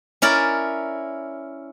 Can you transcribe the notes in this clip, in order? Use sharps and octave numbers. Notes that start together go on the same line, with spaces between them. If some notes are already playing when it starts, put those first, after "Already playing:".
C#4 E4 A#4 D5